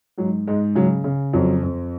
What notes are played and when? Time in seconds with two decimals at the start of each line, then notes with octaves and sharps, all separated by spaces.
0.18 G#2 F#3
0.47 G#2 G#3
0.75 C#3 F#3
1.04 C#3
1.33 F2 F#3
1.63 F2